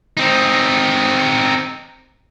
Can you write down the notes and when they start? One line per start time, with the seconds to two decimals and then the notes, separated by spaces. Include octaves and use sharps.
0.17 C4 D#4